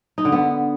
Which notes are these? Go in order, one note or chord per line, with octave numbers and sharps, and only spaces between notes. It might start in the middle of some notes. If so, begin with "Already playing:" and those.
D#4
D3
B3